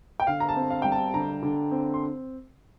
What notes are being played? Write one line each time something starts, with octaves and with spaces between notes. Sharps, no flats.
G5
D3 F5
A#5
A5
C4
F5
G3 G5
A5
D3 A#5
D3
C4
C6